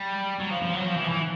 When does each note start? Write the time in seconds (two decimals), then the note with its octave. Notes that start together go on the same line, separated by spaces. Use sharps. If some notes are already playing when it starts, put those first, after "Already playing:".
Already playing: G3
0.40 F#3
0.50 F3
0.62 F3
0.74 F#3
0.86 F3
0.97 E3
1.04 F3
1.09 E3